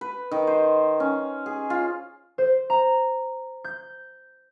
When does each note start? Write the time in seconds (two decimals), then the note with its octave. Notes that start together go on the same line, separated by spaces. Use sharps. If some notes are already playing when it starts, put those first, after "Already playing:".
0.01 B4
0.32 D#3
0.47 C5
1.00 C#4
1.46 G#4
1.70 F4
2.38 C5
2.70 A#5
3.64 G6